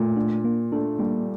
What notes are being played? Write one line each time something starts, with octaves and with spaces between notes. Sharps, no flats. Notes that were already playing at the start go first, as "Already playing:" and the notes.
Already playing: A#2 A3
D4
A#3
A3 D4
G3 A#3